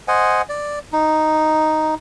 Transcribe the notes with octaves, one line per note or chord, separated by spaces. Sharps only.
C5 D#5 F#5 G#5
D5
D#4